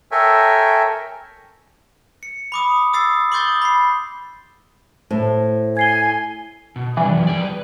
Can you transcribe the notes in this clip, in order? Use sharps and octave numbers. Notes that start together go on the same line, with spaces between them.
A4 A#4 C#5 E5 G5 G#5
C#7
B5 D6 D#6
D#6 E6 A6 C7
C6 D6 D#6 G6 A6 G7
B5 C7
A2 C5
G#5 G#6 C7 G7
B2
C3 E3 G3 D4 F4
F#2 B2 F#3
F3 G#4 D5
B4